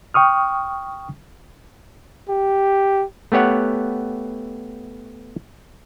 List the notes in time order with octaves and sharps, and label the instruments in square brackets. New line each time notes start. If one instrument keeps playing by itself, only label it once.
[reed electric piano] G5 C#6 D#6 F6
[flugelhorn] G4
[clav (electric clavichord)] A3 B3 G4 C#5 F#5